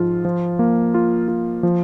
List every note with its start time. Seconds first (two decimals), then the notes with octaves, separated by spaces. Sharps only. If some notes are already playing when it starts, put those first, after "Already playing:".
Already playing: G#2 F3 F4
0.25 F3
0.59 A#3
0.94 F4
1.28 F4
1.63 F3